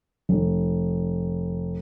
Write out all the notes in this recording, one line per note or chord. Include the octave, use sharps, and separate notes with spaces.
F1